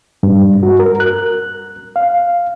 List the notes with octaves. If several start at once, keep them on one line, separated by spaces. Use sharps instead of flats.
G2
F#4
A#4
F#6
F5